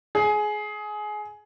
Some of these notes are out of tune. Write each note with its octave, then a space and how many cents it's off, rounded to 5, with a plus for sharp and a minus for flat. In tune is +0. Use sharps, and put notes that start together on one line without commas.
G#4 +20